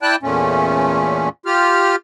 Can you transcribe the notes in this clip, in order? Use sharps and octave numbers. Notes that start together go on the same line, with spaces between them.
E4 D5 G5 A5 F#6
E2 A#2 A3 C#4
F4 G4 F6